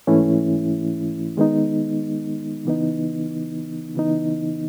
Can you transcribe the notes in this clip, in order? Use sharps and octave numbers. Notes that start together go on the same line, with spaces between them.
G#2 E3 A3 C#4 E4
D#3 G#3 B3 D#4
C#3 E3 B3 D#4
C#3 E3 B3 D#4